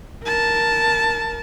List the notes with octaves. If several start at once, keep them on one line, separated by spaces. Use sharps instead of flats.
A#4 A5